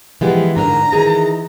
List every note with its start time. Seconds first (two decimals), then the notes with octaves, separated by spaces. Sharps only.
0.21 E3 F3 G#3 B3 G4
0.57 G#2 D3 D4 A#4 A#5
0.92 D#3 E3 D#4 G#4 A#4